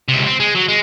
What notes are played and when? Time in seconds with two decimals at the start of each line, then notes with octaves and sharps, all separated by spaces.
0.09 C#2 C3
0.27 C4
0.40 G#3
0.55 F#3
0.69 G#3